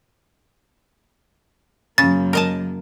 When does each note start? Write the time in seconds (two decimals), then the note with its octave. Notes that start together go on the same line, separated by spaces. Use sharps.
1.98 F#2 C#3 A#3 A6
2.33 A#4 D#5 A5